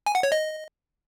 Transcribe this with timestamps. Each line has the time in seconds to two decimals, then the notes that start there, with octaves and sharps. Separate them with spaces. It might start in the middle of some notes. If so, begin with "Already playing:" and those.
0.06 G#5
0.15 F#5
0.23 C#5
0.32 D#5